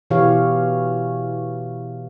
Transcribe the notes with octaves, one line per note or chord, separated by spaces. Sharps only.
B2 E3 G4 C#5 F5